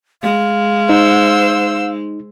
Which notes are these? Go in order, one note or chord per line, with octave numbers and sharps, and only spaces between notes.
G#3 F5
D#4 C5 E6